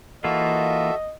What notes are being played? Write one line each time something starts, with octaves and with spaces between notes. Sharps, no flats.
E3 A#3 F4 F#4 A4 D#5 E5